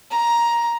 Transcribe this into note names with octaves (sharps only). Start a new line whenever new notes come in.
A#5